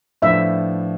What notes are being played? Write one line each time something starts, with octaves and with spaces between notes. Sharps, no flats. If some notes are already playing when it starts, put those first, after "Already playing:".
A2 F3 B3 D4 E5